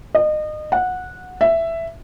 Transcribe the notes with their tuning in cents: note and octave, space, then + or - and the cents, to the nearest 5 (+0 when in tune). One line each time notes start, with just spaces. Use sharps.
D#5 -30
F#5 -15
E5 +10